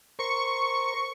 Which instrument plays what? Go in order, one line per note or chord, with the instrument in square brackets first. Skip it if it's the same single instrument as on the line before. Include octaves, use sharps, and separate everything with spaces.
[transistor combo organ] A#4 C5 [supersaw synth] C#6 C#7